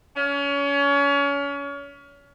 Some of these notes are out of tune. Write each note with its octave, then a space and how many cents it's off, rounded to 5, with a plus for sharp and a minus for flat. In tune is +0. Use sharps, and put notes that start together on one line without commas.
C#4 +30